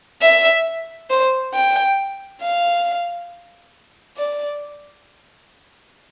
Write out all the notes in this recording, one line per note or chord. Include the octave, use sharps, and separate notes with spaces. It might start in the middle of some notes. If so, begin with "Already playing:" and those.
E5
C5
G5
F5
D5